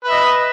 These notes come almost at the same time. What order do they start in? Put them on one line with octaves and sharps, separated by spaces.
B4 E5 D#5